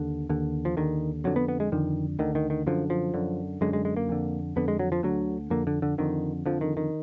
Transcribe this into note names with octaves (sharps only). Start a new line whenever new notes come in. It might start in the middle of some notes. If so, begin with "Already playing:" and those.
Already playing: D#2 D3
D#2 D3
F3
D#2 D3 D#3
F2 D3 F#3
B3
B3
G#3
F2 D3 D#3
D2 D3 D#3
D#3
D#3
F#2 D3 F3
F3
F#2 D3
F#2 D3 G#3
G#3
G#3
A#3
F2 D3
F2 D3 B3
G#3
F#3
F3
D2 D3 F#3
F2 D3 A#3
D3
D3
F2 D3 D#3
F2 D3 F3
D#3
D#3